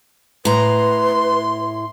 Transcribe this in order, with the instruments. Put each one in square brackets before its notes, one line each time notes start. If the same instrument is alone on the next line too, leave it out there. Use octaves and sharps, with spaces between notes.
[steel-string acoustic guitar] A2 A#5 [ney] B4 [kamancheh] C6